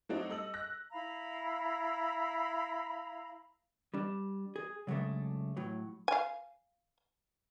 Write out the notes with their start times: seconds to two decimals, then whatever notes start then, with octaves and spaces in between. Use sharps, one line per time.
0.09 F#3 A3 C4 D4 D#4 F#4
0.29 G3 A4 D#5 E6 F#7
0.54 F#6 A#6
0.92 E4 F5 A#5 B5
3.94 G3 D4
4.56 G#4
4.87 C#3 F#3 G#3 A3 D4
5.57 A2 F#3
6.08 F5 G#5